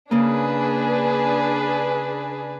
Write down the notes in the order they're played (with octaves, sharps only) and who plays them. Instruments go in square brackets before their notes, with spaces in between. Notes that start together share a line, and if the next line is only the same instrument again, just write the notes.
[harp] C#3 A#3 [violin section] D4 G#4 B4